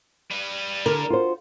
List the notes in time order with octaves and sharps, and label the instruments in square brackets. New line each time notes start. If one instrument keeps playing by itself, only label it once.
[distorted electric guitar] G3 B4
[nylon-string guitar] D3 [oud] A#4
[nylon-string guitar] F4 F#4 C5